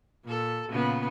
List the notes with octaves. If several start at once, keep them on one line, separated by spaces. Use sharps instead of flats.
A#2 A4
A#2 C#3 B3